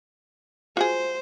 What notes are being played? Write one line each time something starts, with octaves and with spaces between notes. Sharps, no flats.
F4 F#4 G#4 C5